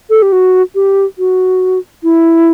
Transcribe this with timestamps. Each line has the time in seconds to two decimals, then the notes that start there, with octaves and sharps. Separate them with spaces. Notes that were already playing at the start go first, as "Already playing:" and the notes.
0.10 A4
0.22 G4
0.32 F#4
0.75 G4
1.18 F#4
2.03 E4